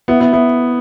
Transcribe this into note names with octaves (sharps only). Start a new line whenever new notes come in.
B3 E4
B3 E4
B3 E4